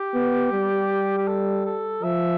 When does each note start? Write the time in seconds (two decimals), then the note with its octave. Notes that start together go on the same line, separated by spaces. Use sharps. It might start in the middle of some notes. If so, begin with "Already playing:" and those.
Already playing: G4
0.14 B3
0.52 G3
1.18 G4
1.27 A4
1.66 A4
2.03 F3 E5